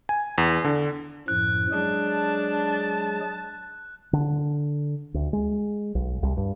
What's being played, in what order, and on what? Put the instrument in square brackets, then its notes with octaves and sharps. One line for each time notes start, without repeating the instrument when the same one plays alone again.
[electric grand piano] G#5
E2
D3
[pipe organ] F#2 A2 F3 [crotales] F#6
[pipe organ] F#3 G#3 G#4 [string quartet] D4
[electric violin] A5
[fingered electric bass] D3
D2
G#3
B1
C2
G2